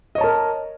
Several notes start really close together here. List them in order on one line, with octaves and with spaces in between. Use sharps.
D#5 C#5 A5 A#4